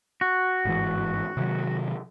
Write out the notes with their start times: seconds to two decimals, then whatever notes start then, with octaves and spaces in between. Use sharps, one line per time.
0.21 F#4
0.65 G1 G#2 E3
1.37 C3 D#3 F#3